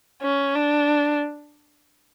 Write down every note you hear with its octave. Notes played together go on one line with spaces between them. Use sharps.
C#4
D4